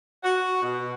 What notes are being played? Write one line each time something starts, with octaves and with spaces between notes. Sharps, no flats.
F#4
B2